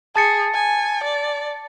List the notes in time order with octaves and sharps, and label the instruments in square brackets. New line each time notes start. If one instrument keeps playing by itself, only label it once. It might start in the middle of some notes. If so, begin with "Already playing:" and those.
[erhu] G#4 [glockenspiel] A5 A6 C#7
[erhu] G#5
D5